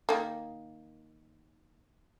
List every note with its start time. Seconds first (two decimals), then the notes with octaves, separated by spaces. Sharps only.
0.09 D#3 A#3